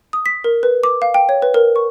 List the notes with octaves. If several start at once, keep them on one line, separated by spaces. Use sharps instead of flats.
D#6
B6
A#4
B4
D6
F5
G5
C#5
B4
A#4
C#6